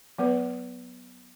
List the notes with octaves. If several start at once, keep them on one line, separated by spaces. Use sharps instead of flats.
F#3 B3 B4